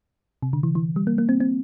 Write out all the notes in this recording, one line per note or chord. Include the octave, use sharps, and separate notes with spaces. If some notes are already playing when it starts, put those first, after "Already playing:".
C3
D3
E3
E3
G3
A#3
A#3
C4
C4